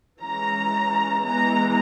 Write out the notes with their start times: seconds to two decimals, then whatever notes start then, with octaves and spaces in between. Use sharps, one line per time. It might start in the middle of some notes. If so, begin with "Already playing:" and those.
0.21 E3 G#3 C#4 A#5
1.23 E3 G#3 B3 A#5